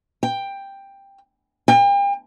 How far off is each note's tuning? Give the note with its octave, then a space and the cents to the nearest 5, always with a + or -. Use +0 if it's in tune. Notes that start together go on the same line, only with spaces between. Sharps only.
G5 +10
G5 +40